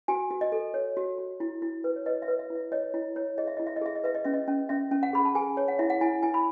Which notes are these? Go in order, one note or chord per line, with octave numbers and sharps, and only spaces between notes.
F#4 G#5
F#4
D#5
A4
C#5
F#4
F#4
E4
E4
B4
C#5
B4 D#5
E5
B4
E5
E4
E5
C#5 D#5
E4
E4 C#5
G#4 D#5
E5
E4 D#5
E5
D#5
G#4 E5
D#5
B4 E5
D#5
C#4 E5
D#5
C#4
C#4 E5
C#4
F#5
G#4 B5
A5
G#4 G#5
C#5
F#5
E4 E5
F#5
E4 G#5
E4 G#5
B5